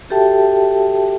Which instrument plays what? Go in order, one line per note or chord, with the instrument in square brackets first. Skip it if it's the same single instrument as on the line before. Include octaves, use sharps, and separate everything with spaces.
[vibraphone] F#4 G4 A4 E5 G5 A5